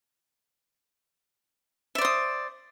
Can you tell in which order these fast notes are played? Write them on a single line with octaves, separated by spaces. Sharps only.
E5 D5 C5 D#6